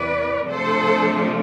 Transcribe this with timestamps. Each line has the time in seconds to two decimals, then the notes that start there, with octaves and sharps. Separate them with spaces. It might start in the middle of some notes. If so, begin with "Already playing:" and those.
Already playing: E2 C3 E3 B4 D5
0.47 C3 F3 A3 D4 A4 C5